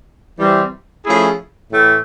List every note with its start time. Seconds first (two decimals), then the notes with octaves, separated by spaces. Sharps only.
0.38 E3 G3 C4
1.05 F3 A3 C#4 E4 G#4
1.72 A2 E3 A3